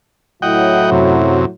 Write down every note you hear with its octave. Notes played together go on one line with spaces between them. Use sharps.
A2 F#3 E4 D#5 F#5 G5
F#2 C3